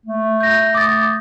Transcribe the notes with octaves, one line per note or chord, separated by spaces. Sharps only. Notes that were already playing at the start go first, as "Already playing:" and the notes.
A3
G6 A#6
D6 D#6 A6